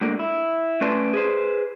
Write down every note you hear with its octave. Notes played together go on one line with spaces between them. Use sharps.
D2 G#2 D3 A#3
E4
A3 C#4 B4 D5 A5 C6
G#4 B4 C5